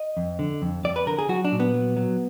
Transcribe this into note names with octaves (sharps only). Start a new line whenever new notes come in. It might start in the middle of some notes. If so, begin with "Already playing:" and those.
Already playing: D#5
F2
D3
F2
F2 D5
B4
D3 A#4
G#4
F#3 F#4
D4
A#2
B3
F#3
F#3